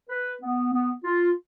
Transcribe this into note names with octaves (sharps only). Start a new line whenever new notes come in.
B4
B3
B3
F4